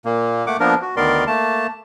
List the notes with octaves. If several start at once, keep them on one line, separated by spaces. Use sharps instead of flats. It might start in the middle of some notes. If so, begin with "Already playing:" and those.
A#2 A#3
A3 A#3 F#5 D6
F3 A#3 B3 D4 A#4
F#4
D2 D#3 B3 A#4 D5 C6
A3 A#3 A5